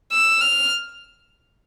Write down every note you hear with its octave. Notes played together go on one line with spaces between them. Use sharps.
E6
F6